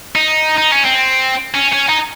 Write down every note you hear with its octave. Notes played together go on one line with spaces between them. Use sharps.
D#4
D#4
C#4
C4
C#4
C#4
D#4